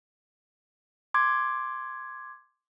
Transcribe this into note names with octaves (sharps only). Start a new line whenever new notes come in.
C6 D6 G#6